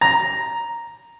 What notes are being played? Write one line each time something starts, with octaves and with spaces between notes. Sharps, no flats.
A#5